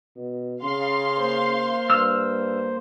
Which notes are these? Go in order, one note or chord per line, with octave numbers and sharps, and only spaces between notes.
B2
C#3 F5 C6
A#3 C5
G2 E6 F6